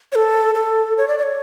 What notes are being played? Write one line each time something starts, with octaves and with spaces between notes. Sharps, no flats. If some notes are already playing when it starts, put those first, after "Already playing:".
C#5
A4
A4
C#5
D5
D5
C#5